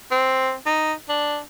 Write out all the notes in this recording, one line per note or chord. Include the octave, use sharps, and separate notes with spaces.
C4
D#4
D4